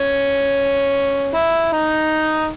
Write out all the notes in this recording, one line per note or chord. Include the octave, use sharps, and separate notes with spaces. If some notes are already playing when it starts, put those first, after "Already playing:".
Already playing: C#4
E4
D#4